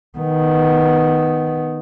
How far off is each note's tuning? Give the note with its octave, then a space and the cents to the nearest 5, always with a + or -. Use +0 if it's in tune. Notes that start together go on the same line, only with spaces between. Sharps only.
D#3 +0 B3 +0